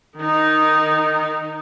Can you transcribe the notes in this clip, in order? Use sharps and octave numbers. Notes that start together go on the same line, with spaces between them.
D#3 D#4